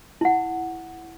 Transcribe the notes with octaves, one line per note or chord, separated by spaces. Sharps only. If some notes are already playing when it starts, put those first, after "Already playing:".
E4 F#5